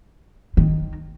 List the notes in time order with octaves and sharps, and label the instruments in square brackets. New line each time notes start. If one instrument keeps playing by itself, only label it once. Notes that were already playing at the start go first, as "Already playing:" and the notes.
[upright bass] D#3